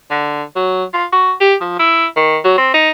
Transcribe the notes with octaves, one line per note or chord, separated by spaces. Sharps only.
D3
F#3
F4
F#4
G4
F3
E4
D#3
F#3
C4
D#4